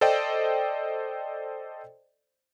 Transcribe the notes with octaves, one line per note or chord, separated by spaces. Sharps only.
A4 C5 D5 D#5 G5